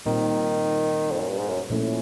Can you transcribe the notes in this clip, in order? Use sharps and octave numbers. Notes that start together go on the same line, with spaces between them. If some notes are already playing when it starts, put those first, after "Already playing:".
A#2 D#3 G3 C4 D#4
F2
F#2
G2
G#2
F#2
A#2 F3 A3 C#4 E4